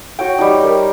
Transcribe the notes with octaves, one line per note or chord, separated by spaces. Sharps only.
F#4 C#5 G5
G3 D#4
A#4